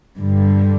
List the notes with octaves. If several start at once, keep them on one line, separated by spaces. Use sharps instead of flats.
G2 D3 G3